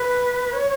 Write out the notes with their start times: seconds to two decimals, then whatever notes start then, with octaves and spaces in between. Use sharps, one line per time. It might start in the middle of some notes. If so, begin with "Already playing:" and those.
Already playing: B4
0.53 C#5